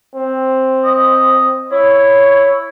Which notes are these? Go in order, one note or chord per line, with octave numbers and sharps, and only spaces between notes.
C4
D#5
E4 C#5